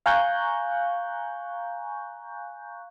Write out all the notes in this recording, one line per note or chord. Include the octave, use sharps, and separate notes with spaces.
F5 G#5 A#5 C#6 F#6 G6